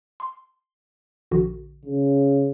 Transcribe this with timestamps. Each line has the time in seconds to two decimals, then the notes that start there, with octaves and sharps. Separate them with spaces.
0.20 C6
1.31 A#1 D3 F#4
1.86 C#3